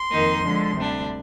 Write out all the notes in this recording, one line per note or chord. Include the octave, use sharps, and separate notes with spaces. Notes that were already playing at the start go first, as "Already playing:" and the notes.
Already playing: C6
F2 D#3 A#3 D#4
D3 F3 G#3
D2 C3 G3 D4